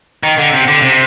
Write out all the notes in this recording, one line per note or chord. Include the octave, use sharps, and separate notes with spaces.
D#3
D3
C3
D3
C3